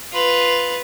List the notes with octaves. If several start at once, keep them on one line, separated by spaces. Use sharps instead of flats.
F4 B4